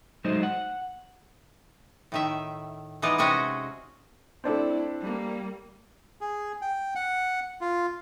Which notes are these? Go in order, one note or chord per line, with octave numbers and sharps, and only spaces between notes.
F#3 G#3 A3 D#4 C5
F#5
A2 D#3 E5
E3 G#3 B3 D#4 D5 D#5
C3 G#3 C#4 F#4 D#5
A3 C4 D4 E4 A4
G3 A#3
G#4
G5
F#5
F4